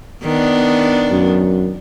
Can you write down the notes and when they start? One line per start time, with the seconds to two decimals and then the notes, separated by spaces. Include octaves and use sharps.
0.24 D#3 B3 D4
1.11 F#2